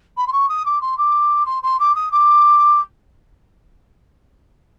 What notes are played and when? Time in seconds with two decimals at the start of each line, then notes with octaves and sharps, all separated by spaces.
0.17 B5
0.27 C6
0.32 C#6
0.49 D#6
0.65 D6
0.81 C6
0.98 D6
1.46 C6
1.63 C6
1.79 D6
1.95 D#6
2.12 D6